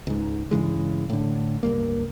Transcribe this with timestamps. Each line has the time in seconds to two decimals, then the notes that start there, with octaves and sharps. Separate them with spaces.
0.07 C#2 G#2
0.51 G2 C#3 E3 G#3
1.10 A2 D3
1.63 C#2 G2 A#3